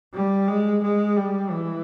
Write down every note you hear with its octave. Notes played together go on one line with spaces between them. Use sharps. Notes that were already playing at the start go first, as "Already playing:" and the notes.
G3
G#3
G#3
G3
E3